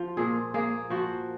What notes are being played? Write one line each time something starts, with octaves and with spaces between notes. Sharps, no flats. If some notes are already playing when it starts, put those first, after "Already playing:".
Already playing: F3 F4
A#2 G#4
A#3 G#4
F3 F#4